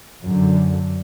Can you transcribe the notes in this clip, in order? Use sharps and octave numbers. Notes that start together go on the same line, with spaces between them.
F#2 D3